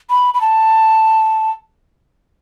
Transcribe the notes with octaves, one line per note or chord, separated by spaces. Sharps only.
B5
B5
A5